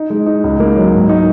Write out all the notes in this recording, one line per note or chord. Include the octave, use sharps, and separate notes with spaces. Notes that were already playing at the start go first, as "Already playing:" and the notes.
Already playing: D#4
G#3
D#4
C#2
A#3
F#3
G#2
D#4